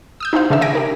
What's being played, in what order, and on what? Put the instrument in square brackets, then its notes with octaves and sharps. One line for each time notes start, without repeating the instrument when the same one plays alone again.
[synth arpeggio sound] D#6 E6 G6
D#4 E4 G#4 C5 F5
C#3 E3 D4 E5 E6
E5 G#5 G#6 A#6 D7
G4 A#4